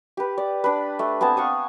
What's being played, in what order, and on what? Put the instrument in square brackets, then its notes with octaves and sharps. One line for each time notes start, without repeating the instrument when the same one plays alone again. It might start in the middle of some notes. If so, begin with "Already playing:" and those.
[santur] G4 B4
D5
D4 B4
A3
B3 C4 G#5 A5
F5 F#5 C#6 D#6